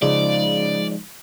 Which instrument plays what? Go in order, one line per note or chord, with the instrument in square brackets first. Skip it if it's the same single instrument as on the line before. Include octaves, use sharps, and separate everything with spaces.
[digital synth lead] C#3 [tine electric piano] F3 G#3 D#4 [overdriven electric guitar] D5